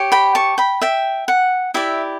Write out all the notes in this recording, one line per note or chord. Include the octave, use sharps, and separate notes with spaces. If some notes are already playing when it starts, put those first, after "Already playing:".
Already playing: G4 C#5
G5 B5
A5 C#6
G5 B5
E5 G5
F#5
E4 G4 D5 E5